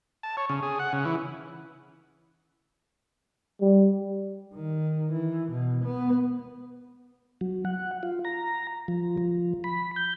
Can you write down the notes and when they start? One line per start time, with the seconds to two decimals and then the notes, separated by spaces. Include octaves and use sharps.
0.23 A5
0.37 C#5
0.49 C#3
0.63 G#4
0.79 F#5
0.93 C#3
1.05 E3
3.61 G3
4.55 D#3
5.13 E3
5.51 B2
5.85 B3
7.41 F#3
7.65 F#5
8.03 F4
8.25 A#5
8.88 F3
9.17 F3
9.64 B5
9.96 G6